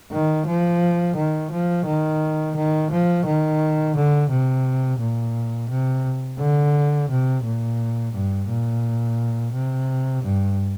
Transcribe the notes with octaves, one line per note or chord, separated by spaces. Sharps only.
D#3
F3
D#3
F3
D#3
D#3
F3
D#3
D3
C3
A#2
C3
D3
C3
A#2
G2
A#2
C3
G2